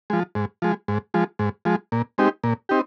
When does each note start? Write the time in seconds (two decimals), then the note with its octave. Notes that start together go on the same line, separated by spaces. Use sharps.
0.10 F3 G#3
0.35 G#2
0.62 F3 G#3
0.88 G#2
1.14 F3 G#3
1.39 G#2
1.65 F3 G#3
1.92 A#2
2.18 G#3 C4 D#4 G4
2.44 A#2
2.69 C4 D#4 G4